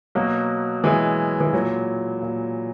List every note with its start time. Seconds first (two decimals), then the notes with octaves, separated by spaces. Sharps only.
0.15 B2 F#3 A#3
0.84 B2 E3 G#3
1.41 E3
1.53 A#2 F#3
2.22 A#2